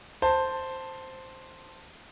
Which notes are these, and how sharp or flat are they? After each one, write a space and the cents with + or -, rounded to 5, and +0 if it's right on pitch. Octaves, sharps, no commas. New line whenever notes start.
C5 +0 A5 +10